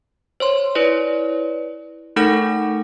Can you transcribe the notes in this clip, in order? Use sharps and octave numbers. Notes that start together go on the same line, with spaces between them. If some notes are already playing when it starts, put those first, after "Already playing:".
C5 C#5 C6
E4 B4 C#5 D5
A3 D#4 A4 A#4 F#5 G6